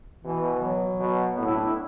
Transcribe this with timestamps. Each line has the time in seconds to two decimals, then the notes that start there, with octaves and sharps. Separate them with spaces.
0.25 B2 E3
0.57 E3
0.62 F#3
1.00 B2
1.37 A2 B3
1.46 E4
1.56 D4
1.65 E4